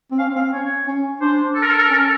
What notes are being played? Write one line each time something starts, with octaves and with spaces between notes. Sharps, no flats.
C4
C#4 F5
C4 F5
C#4 C#5
C#4
D4 C5
A4
A#4
A4
A#4
A4
C#4 A#4
A4